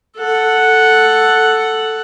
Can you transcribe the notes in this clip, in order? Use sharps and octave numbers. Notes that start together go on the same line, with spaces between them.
A4 F#5